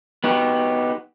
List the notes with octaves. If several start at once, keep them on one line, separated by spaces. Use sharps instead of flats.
B3 D#4 F#4 G4